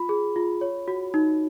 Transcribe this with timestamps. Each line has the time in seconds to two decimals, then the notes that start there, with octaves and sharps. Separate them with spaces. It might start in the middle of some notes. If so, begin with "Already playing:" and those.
Already playing: F4 B5
0.09 G#4
0.36 F4
0.61 C#5
0.88 F#4
1.14 D#4